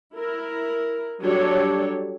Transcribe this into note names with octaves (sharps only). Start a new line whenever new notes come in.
E4 A#4
F#3 G3 D4 G4 A4 C#5